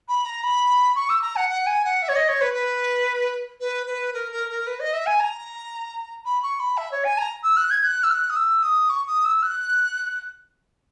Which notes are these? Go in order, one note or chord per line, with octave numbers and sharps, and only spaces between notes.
B5
A#5
B5
C#6
E6
A#5
F#5
F#5
G#5
F#5
E5
C#5
D#5
C#5
B4
B4
B4
B4
A#4
A#4
A#4
B4
D#5
E5
G#5
A#5
B5
C#6
B5
E5
C#5
G#5
A#5
E6
F#6
G#6
F#6
E6
F#6
D#6
E6
D#6
C#6
D#6
E6
F#6